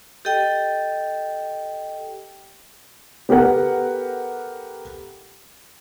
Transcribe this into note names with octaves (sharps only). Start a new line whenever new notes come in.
G4 A4 D#5 G5
B3 G4 A4 A#4 F#5